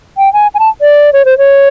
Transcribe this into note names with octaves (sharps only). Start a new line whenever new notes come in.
G5
G#5
G#5
A5
D5
C#5
C5
C#5